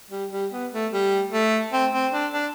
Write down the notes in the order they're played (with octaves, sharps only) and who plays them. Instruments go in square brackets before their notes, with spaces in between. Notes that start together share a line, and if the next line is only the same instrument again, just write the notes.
[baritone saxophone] G3
G3
B3
A3
G3
A3
C4
C4
D4
D4